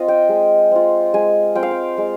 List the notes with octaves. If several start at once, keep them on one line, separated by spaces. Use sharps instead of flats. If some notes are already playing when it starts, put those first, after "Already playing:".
Already playing: C4 F4 D#5
G5
G#3
C4 F4
G#3 G#5
C4 F4 G5
F5
G5
G#3